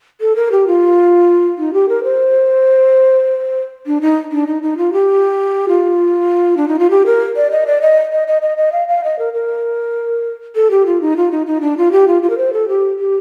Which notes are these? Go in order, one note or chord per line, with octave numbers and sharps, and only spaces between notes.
A4
A#4
G4
F4
D#4
G4
A#4
C5
D4
D#4
D4
D#4
D#4
F4
G4
F4
D4
D#4
F4
G4
A#4
D5
D#5
D5
D#5
D#5
D#5
D#5
D#5
F5
F5
D#5
A#4
A#4
A4
G4
F4
D#4
F4
D#4
D#4
D4
F4
G4
F4
F4
A#4
C5
A4
G4
G4